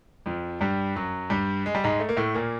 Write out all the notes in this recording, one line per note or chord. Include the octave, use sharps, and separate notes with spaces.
F2 F3
G2 G3
F#2 F#3
G2 G3
G#3
G3
G#2 G#3
A3
A#3
A2 A3
A#2 A#3